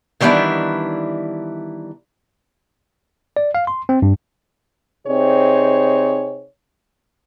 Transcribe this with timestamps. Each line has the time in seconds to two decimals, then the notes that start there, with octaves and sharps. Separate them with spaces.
0.21 D#3 E3 G3 B3 D4 E4
3.37 D5
3.55 F5
3.67 C6
3.89 C4
4.02 G2
5.07 C3 C4 D#4 G#4 C#5 D5